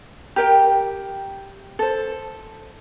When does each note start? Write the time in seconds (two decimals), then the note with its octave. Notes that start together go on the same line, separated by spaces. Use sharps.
0.36 G4 A#4 G5
1.79 A4 C5